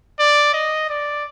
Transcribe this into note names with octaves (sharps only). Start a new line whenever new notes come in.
D5
D#5
D5